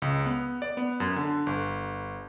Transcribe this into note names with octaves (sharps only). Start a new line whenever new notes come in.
C#2
B3
D5
B3
F#2
D3
G1